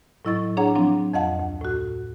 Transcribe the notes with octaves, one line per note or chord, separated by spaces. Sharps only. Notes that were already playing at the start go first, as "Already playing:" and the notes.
A2 F#3 E4 D#5 C#6 A6
D4 G#4 C#5 F#5 A#5
F3 F#3 C4 D4
F2 D#5 F5 F#5 A5
D2
A2 F#4